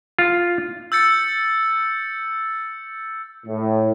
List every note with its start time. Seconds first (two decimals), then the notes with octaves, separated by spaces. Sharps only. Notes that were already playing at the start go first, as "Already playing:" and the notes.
0.19 F4
0.92 E6 G6 A6 C#7
3.46 A2